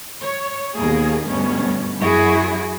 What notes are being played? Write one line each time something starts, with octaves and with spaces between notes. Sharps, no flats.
C#5
D#2 B2 A#3 G#4
D2 G2 B2 C#4
F#2 F#3 E4 F#4 G#4